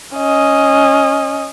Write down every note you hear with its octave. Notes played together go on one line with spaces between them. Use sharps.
C#4 D#5